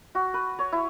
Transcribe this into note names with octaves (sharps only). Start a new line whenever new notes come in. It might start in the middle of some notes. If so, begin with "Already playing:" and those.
F#4
B4
C#5
E4